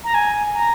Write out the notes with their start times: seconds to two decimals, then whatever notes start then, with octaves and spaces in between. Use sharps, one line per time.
0.04 A#5
0.14 G#5
0.55 A#5